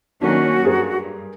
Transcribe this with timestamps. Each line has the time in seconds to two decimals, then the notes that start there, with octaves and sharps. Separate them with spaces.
0.21 D#3 F#3 A#3 C#4 D4 F#4
0.63 G2 G4 G#4 A#4